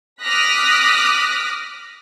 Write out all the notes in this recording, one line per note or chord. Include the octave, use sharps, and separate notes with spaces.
D6 D#6 F6 F#6 A#6 B6